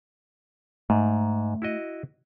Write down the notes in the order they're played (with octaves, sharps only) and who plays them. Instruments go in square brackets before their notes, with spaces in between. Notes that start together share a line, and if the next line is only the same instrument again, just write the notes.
[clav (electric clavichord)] G#2 [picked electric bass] A3
[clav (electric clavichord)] E4 F#4 D#5